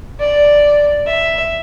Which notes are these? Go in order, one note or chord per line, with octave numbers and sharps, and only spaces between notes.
D5
E5